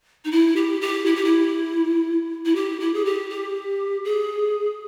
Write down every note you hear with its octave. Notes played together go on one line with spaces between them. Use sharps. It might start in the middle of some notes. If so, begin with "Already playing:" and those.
D#4
E4
G4
G4
E4
G4
E4
E4
G4
E4
G#4
G4
G4
G#4